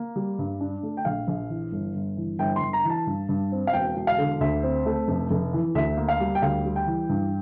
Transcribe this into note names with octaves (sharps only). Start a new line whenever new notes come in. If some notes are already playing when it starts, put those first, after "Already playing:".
Already playing: A#3
G3
G2
D4
A3
G5
A#1 F5
A#1
E3
G1
G1
E3
G1 G5
C6
G1
A#5
E3
A5
G2
G2
C4
F5
E1 G5
E1
F5
D3
D2 E5
C4
A3
F1
F1
E3
D2 E5
A#3
F5
G3
G5
D2 F5
G3
G5
E3
G2